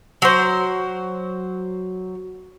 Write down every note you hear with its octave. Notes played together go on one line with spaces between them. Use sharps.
F#3 C5